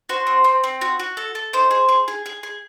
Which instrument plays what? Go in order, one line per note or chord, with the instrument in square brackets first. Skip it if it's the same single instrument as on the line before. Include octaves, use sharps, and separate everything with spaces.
[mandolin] F#4 C5
C4
C4
C4
F#4
F#4
A4
A4
D#4 C5
G#4
G#4
G#4
G#4
G#4